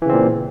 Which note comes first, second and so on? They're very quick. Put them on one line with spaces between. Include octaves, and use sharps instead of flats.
E3 C#3 C4 A#2